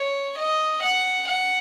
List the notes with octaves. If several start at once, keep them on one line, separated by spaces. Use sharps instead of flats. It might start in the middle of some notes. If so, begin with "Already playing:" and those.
Already playing: C#5
D#5
F#5
F#5